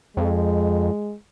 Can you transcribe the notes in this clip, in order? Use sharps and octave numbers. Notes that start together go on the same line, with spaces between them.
F2 G#3